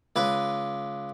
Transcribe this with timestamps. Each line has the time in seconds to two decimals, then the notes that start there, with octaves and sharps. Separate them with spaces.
0.16 C#2 B4